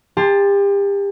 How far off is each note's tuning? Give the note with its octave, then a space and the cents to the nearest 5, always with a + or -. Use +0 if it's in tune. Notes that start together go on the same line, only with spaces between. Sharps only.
G4 +35 A5 +0 C6 +0